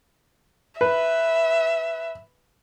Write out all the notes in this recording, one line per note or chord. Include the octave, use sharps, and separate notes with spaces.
B4 E5